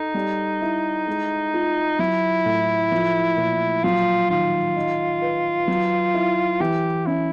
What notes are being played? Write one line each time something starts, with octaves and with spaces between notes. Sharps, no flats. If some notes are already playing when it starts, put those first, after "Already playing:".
Already playing: D#4 A4
G3
E4
G#3
F4
F#3 E4
A2
F3
A#2
F#3 F4
D#3 F4
D#4
B4
F#3
E4
E3 G4
C#4 E4